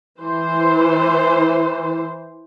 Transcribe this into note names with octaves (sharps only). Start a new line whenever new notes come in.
E3 C5